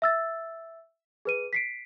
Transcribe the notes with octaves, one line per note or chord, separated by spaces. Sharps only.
E5 E6 A6
G#4 B4 D#7
B6 C7 D7